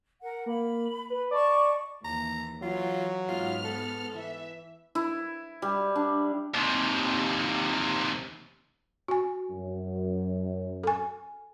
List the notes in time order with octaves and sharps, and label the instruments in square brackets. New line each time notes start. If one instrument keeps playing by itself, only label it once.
[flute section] A#4 F#5
[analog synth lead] A#3 [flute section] B5
[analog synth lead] B4
[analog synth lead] D5 [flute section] D#5 A5 C#6
[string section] D#2 E3 [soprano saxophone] A#5
[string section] E3 [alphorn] F#3 [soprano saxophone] F4
[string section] G#2 B3 F6 [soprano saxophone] F4
[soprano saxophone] A4
[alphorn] E3 [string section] E5
[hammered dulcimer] E4
G3
D4
[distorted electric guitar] D#2 C3
[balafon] F#4 G#5
[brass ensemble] F#2
[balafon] A4 G#5